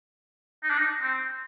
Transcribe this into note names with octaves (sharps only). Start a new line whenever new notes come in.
D#4
D4
D#4
C4